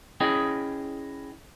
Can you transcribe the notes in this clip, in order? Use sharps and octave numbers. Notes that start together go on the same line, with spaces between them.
C#4 E4 G#4 C#5 D#5 G5